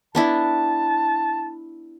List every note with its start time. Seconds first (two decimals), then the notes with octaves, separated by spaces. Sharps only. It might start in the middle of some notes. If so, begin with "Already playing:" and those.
0.15 B3 D4 E4 A5